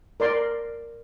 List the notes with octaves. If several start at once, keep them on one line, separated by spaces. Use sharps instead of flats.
A#4 D5 C6